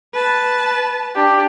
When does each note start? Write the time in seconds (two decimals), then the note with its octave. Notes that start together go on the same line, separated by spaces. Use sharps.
0.14 B4 A5
1.16 D4 G4